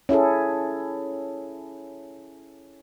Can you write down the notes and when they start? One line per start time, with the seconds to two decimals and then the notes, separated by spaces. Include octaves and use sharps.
0.09 C#4 E4 G#4 A4